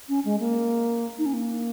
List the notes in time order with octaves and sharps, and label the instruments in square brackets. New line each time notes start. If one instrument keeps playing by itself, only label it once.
[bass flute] C#4
G#3
A#3
D#4
C#4
A#3